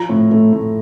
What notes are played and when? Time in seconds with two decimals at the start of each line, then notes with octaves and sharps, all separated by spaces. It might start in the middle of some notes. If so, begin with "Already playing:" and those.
Already playing: F3 A#5
0.09 A2
0.31 A3
0.53 A2